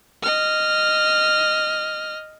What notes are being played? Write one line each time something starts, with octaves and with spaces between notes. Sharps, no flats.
D#5 F6